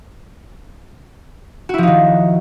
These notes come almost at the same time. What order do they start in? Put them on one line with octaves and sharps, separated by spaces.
F#4 E4 F3 D#4 D#3